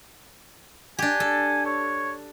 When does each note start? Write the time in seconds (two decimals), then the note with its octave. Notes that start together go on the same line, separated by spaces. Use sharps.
0.99 D4 G4 G#5
1.20 A4
1.65 C#5